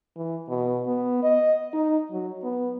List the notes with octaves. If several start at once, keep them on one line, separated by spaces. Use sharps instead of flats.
E3
B2
B3
D#5
D#4
F#3
B3